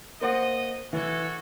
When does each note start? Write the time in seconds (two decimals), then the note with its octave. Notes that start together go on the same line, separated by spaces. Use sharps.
0.21 A#3 C5 D#5 F#5
0.93 E3 F#4 A4 C#5